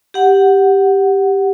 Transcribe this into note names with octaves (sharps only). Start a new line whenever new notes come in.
G4 F#5